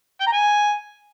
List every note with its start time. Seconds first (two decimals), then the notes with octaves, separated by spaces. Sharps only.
0.21 G5
0.27 A#5
0.33 G#5